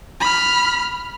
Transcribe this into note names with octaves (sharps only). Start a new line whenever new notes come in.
B5 F6